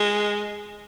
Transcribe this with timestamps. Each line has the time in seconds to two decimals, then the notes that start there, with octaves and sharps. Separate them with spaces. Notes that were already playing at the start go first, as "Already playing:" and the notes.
Already playing: G#3